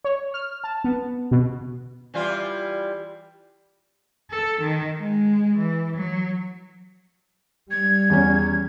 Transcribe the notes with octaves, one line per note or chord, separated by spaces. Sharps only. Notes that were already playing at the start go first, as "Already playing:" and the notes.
C#5
F6
A5
B3
B2
E3 G3 F4
A4
D#3
G#3
E3
F#3
G3 G#6
E2 C#4